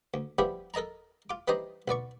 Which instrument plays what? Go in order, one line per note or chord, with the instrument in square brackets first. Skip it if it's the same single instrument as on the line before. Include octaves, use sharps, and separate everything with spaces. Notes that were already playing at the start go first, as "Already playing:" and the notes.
[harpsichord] D2
F3 G3 B3 D4 E4 G4
A4 A#4 D#5 A5 A#5
F4 D6
E3 G3 D4 D#4 C5 D#5
B1 B3 D5 C#6